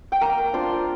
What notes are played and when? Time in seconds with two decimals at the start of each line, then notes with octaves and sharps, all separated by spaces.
0.12 G5
0.21 A#3 A#4 A#5
0.53 D4 F4 C5 C6